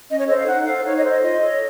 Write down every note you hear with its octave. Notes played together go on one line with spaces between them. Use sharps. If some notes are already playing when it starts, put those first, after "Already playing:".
C#4 D#5
C#5
A4 C5 D#5
F5
D#4 F#5
A4 C5 F5
D#4 C#5
D#5
A4 C5
D#5
F4 D#5
A4 C#5